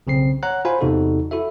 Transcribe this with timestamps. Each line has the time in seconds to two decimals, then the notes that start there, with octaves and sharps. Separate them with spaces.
0.07 B1 C#3 C4 C7
0.43 C#5 F#5 A#5 F#6
0.65 F4 F#4 C5 F5 G#5 B5
0.81 E2 C3 D#4 F#4 A4
1.31 E4 F#4 A4 E5